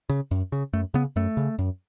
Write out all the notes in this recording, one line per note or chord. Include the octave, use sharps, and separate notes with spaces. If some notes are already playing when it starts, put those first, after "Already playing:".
C#3
F#2
C#3
F#2 A3
C#3 B3
F#2 A3
C#3
F#2